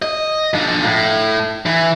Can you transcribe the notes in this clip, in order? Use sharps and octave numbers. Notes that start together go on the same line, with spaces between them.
D#5
F3 D4
A2
E3